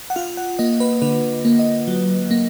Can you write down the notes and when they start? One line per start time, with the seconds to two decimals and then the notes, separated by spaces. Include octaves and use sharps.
0.10 F#5
0.16 F4 F5
0.37 F#5
0.59 A#3 D#5
0.80 B4
1.02 D3 B4
1.45 A#3
1.59 D#5
1.88 F#3
2.31 A#3